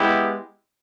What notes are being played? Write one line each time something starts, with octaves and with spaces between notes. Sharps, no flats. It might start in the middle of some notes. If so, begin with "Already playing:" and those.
Already playing: G#3 B3 E4 G4